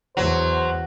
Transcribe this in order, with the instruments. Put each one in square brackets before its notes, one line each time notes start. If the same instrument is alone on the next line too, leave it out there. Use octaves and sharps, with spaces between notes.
[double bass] E2 [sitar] F#3 [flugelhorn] C5